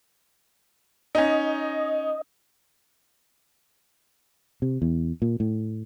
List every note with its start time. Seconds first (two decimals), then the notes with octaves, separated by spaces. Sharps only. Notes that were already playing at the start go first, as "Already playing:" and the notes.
1.15 C#4 D#4 D#5
4.62 C3
4.82 E2
5.22 A#2
5.40 A2